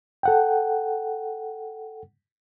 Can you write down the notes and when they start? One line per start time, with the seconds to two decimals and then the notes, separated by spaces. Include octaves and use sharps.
0.23 A4 F#5 G5